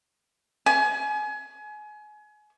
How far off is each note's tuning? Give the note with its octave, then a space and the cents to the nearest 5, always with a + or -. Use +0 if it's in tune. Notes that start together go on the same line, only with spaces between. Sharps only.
G#5 +30